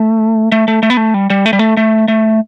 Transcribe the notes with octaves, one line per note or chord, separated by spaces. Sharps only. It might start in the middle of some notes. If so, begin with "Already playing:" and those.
Already playing: A3
A3
A3
A3
B3
A3
G3
G3
A3
G3
A3
A3
A3